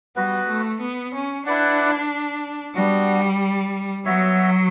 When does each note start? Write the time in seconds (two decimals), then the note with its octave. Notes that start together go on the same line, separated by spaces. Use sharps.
0.16 G3 B3 F#4 B4
0.48 A3
0.81 B3
1.14 C#4
1.46 D4 E4 B4 D5 F#5
2.76 G3 B3 D4 F#4
4.06 F#3 B3 F#4 C#5 E5